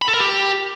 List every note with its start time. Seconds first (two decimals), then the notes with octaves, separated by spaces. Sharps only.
0.02 B5
0.08 A4
0.14 A#4
0.20 G4